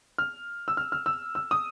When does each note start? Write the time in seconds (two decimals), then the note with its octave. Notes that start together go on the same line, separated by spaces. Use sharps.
0.18 F6
0.68 E6
0.77 F6
0.92 F6
1.06 E6
1.35 E6
1.51 D#6